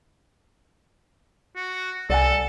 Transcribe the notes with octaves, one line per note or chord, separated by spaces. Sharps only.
F#4
C2 A4 D5 F#5 G#5